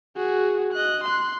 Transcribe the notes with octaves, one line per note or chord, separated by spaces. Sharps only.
F#4 G#4
D#5 F#6
C6 F#6